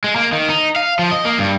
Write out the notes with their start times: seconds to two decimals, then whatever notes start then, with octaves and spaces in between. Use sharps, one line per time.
0.04 G#3
0.16 A#3
0.32 D#3
0.50 D#4
0.76 F5
0.99 F3
1.11 D#5
1.25 A#3
1.38 G2